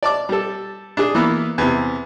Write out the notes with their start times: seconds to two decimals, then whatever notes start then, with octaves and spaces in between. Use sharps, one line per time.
0.03 D5 A5 D6
0.29 G3 A4
0.97 D4 G#4
1.15 E3 A#3 B3
1.58 E2 C3